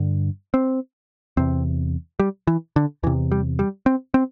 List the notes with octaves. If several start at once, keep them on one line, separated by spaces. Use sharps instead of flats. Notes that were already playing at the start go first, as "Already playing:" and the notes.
Already playing: G2 D3
C4
E2 C3 C4
G3
E3
D3
E2 C3 E3
G3
G3
C4
C4